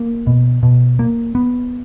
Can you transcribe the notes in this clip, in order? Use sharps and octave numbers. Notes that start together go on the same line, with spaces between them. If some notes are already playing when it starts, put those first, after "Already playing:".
Already playing: A#3
B2
B2
A#3
B3